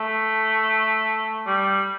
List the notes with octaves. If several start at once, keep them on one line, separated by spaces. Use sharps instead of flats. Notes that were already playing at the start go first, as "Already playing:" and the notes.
Already playing: A3
G3